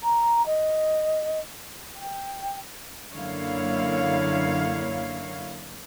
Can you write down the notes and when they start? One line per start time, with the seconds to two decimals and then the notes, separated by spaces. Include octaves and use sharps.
0.03 A#5
0.46 D#5
1.96 G5
3.12 F#2 D3 A#3 E4 C#5 F5